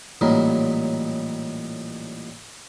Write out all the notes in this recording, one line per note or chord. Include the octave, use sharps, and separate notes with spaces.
A1 A#2 F#3 G3 D#4 A#4